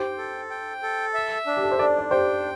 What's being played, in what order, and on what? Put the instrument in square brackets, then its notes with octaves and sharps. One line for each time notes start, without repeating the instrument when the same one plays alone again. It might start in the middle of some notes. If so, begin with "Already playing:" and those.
Already playing: [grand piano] G4 C5 [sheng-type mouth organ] G5
[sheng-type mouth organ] A4
G5
A4
E5
D4
[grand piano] G4
A4
C5
[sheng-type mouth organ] D4 [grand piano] A4 D5
[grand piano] D5
[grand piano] G4 C5 [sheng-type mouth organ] G5